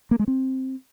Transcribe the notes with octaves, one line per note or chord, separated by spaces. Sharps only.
A#3
G#3
C4